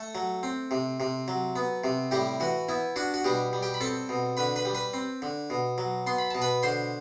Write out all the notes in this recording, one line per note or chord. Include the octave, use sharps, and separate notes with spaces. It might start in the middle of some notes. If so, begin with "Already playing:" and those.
Already playing: A3 A4
F#3
C4
C3
C3
F#3
B3
C3
A2 G3 G4
E3 F#4
B3 E4
D4 F#4
F#4
B2 G3 G4
G3
G4 G5
B5
C4 A4 A5
B2
D3 B4 B5
B4 B5
G3
B4 B5
C4
D3
B2
F#3
B3 C6
B5
B2 A5
B4 B5
D3 C5 C6